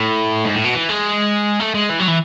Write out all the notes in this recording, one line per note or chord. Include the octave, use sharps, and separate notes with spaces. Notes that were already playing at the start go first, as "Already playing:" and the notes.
Already playing: A2
G#2
A2
B2
E3
G#3
A3
G#3
E3
F#3
E3